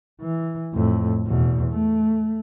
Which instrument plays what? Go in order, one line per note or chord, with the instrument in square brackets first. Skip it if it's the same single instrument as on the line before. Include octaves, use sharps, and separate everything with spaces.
[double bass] E3
F2 A2
E2 B2
A3